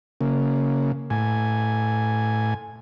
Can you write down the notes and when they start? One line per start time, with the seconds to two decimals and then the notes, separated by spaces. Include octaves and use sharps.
0.21 C#3 A#3
1.10 A2 G#5